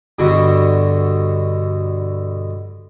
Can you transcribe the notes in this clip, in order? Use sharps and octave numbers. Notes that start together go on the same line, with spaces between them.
G2 B2 D3 F#4